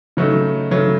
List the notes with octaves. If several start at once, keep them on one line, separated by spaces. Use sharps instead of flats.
C#3 F#3 A3 D#4
C#3 F#3 A3 D#4